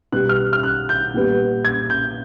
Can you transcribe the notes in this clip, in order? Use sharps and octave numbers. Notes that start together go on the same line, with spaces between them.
B2 G3 B3 F#6
F6
F6
F#6
G6
A#2 G3 B3
G#6
G6